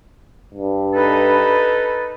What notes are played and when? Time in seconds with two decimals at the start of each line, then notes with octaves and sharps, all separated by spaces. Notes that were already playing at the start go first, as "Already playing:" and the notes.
0.54 G2
0.94 D#4 A4 B4